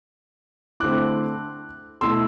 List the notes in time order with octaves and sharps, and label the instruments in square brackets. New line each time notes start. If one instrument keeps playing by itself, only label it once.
[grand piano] D3 A3 C4 E4 D6 F#6
B2 A3 E4 C6 E6